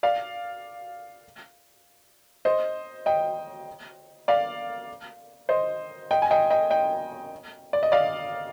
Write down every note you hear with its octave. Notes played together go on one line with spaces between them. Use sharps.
D5 F5
C5 D#5
D#5 G5
D5 F5
C5 D#5
D#5 G5
G#5
D#5 G5
D#5 G5
D#5 G5
D5
D#5
D5 F5